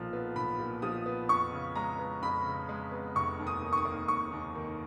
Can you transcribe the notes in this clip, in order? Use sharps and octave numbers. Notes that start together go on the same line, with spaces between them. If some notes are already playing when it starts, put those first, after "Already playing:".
Already playing: B1 A#2 F3
B3
B1 B5
A#2
F3 D#6
B3
F2 C#6
C#3
G#3 A#5
B3
F2 B5
C#3
G#3
B3
F1 C#6
D#2
D#6
D#3
C#6
D#6
A#3
F1 C#6
D#2
D#3